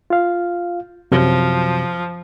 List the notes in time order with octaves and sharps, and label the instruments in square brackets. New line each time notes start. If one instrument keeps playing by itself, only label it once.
[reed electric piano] F4 F5
[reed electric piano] F#2 C3 F#3 [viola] F3